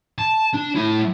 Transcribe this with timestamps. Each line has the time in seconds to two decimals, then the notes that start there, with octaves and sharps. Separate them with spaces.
0.19 A5
0.53 D4
0.75 A3 E4